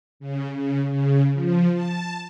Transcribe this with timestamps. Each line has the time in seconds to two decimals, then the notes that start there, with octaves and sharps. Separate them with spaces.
0.20 C#3
0.55 C#3
0.91 C#3
1.33 F3
1.74 A5